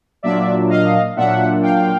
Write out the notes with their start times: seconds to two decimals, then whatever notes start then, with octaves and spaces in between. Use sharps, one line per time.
0.23 A#2 F#3 A#3 D4 F4 D5 E5
0.69 D#5 F5
1.16 A#2 F#3 A#3 D4 F4 E5 F#5
1.62 F5 G5